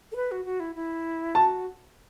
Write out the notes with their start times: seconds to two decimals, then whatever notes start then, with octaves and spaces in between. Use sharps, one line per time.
0.12 A4
0.16 B4
0.31 F#4
0.45 F#4
0.60 E4
0.75 E4
1.35 F#4 A5